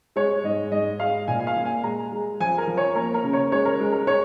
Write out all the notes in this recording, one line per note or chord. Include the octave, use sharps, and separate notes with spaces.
G#3 C#5
G#2 D#5
G#2 D#5
G#3 F5
A#2 G#5
G#5
F5
A#3
G#5
G#3 A#5
G#3
F3 G#5
A#4
F3
C#5
A#3 A#4
A#4
C#3
C#5
G#3 C#5
A#4
G#3
A#4
G#3 C#5